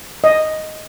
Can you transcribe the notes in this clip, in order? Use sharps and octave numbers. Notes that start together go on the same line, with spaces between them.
D#5